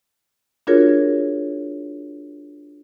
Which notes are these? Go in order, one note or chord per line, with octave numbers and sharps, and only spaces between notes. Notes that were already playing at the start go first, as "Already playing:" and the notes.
D4 F4 F#4 G#4 A#4 C#5